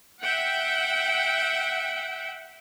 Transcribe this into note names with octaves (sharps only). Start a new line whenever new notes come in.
E5 F#5 G5